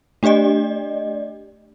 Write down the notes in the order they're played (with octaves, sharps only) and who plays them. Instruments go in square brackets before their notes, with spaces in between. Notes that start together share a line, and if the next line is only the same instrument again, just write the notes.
[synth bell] A3 D4 G4 D5 D#5